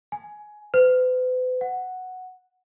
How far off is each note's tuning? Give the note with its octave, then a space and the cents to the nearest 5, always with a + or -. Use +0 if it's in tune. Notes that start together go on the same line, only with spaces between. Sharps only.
G#5 +15
B4 +45
F#5 +0